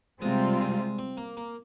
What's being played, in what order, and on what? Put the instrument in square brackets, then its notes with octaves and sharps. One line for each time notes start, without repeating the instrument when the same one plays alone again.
[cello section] C3 G3 C4 F4 [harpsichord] G#3
[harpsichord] G#3
C4
A#3
A#3